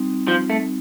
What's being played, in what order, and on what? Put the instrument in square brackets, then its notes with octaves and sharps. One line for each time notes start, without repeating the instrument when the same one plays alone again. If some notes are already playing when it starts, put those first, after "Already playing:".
Already playing: [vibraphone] G3 C4 D#4
[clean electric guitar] F3
A3